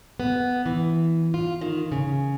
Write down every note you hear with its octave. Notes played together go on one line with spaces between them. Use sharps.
B3
E3
F4
D#3
C#3